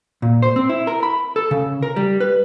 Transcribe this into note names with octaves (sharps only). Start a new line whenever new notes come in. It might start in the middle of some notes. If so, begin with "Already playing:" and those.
A#2
C5
C4
E4
A#4
B5
A4
C#3
A#4
G3
B4